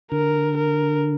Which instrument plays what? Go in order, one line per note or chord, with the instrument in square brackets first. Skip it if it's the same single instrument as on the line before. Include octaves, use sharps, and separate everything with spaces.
[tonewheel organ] D3 [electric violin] A#4
[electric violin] A#4